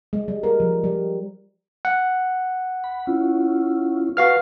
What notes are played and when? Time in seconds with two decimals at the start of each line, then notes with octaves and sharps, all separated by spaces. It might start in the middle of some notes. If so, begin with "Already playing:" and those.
0.13 G#3
0.28 G3
0.43 A#4
0.60 F3
0.84 G3
1.85 F#5
2.84 B5
3.07 C#4 E4 F4
4.17 F#4 B4 F5 A5 F6